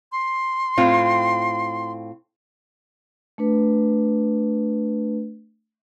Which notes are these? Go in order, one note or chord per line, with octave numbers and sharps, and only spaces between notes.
C6
A2 C4 F4
A3 D4 B4